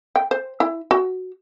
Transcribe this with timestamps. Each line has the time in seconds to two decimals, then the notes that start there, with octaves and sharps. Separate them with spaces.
0.16 G5
0.31 C5
0.60 E4
0.91 F#4